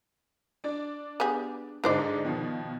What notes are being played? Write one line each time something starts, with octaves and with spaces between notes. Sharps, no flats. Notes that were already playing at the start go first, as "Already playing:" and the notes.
D4 D5
B3 G4 G#4
G#2 D3 D4 D#4 C5 D5
B2 D#3 F3